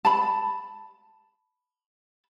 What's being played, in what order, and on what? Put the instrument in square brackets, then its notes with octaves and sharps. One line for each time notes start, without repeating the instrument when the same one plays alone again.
[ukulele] A5 B5